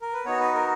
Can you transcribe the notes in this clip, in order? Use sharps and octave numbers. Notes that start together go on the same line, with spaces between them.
A#4
B4
B3 D#4 F#4 C#5
B4
A#4